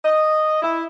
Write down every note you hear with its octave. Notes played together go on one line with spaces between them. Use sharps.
D#5
E4